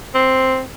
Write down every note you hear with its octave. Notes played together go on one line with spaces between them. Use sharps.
C4